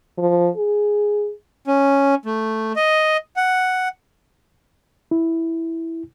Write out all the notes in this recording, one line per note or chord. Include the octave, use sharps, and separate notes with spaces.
F3
G#4
C#4
A3
D#5
F#5
E4